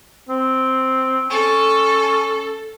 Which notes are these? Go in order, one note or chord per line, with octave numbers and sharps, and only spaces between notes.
C4
C#4 A4